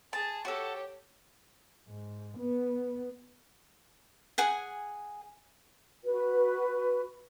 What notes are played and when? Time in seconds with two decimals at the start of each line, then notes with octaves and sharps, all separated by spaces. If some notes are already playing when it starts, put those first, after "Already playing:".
0.13 G#4 A5
0.45 F#4 G4 A4 C#5
1.88 G#2
2.38 B3
4.38 G#4 F#5 G#5
6.05 F#4 B4